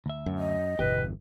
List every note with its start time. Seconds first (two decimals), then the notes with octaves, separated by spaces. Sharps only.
0.06 D2 E5
0.26 F#2
0.39 D#5
0.79 G1 E2 B2 G4 B4